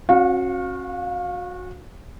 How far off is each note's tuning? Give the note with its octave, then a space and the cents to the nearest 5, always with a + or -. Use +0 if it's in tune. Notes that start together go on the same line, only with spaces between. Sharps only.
C#4 -35 F#4 -25 F5 +20